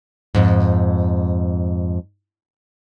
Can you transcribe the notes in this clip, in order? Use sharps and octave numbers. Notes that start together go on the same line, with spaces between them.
F2 G#2